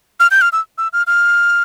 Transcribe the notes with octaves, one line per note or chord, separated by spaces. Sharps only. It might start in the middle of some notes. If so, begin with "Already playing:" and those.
F6
G6
F6
E6
E6
F6
F6